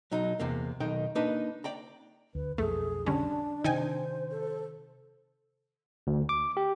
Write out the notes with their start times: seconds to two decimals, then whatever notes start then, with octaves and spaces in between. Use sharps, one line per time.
0.11 B1 F#3 D#4
0.39 E2 C3 A#3
0.80 B1 D#3 D#4 G5
1.15 A#3 D4 D#4 B4
1.64 D5 G5 A#5
2.35 D2 B4
2.58 B1 F2 A3 G#4 A4
3.06 D3 G3 C#4 D4 A5
3.64 C3 D#3 D#4 C5 G5 G#5
4.31 A4
6.07 D2
6.29 D6
6.57 G4